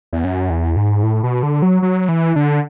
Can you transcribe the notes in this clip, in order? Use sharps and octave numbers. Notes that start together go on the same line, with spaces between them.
E2
F#2
E2
G#2
A2
B2
D3
F#3
F#3
E3
D3